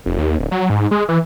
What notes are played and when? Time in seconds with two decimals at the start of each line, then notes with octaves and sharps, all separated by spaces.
0.06 F1
0.18 D#2
0.39 D1
0.51 F#3
0.70 G#2
0.91 G#3
1.09 E3